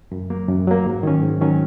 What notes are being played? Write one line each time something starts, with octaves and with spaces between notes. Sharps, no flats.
F#2
F#3 A#3
F#2
F#3 A#3
G#2
D#3 F#3 C#4
G#2
D#3 F#3 C#4